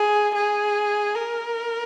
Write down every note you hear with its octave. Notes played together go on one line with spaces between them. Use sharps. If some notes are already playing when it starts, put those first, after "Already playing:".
Already playing: G#4
G#4
A#4